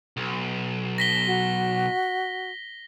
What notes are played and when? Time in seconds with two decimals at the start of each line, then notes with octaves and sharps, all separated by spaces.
0.17 B1
0.98 A#6 B6 G7
1.27 F#4